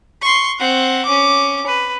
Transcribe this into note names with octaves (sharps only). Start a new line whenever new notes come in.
C6 C#6
C4 F#5
C#4 D6
B4